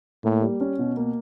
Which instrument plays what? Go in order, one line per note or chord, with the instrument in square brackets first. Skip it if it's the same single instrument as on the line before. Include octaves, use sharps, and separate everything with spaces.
[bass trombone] A2 [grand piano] A#3
[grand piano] G3
C#4
B2
A#3